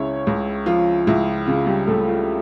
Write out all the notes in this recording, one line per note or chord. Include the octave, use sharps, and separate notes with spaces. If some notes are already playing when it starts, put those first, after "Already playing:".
Already playing: C#2 C#3 C#4 E4 C#5
C#2
F3 F4
C#2 E4
C#3 F4
G3 G4
C#2 A3 A4
F4